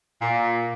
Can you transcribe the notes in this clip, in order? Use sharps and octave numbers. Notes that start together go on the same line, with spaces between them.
A#2